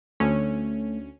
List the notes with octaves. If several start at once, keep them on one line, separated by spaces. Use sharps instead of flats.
D2 A3 C#4